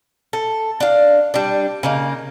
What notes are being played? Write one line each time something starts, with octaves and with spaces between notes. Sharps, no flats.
A4
D4 F5
G3 D4
C#3 A#3 D#4